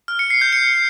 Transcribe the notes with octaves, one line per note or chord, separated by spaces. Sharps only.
F6
C#7
C7
G6
C#7